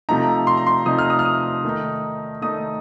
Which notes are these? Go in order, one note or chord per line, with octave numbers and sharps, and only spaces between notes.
C3 F3 A3 D#4 A#5
C6
A#5
C6
C3 F3 A3 D#4 D#6
F6
D#6
F6
D#6
D#3 A3 D#4
D#3 A3 D#4 D#6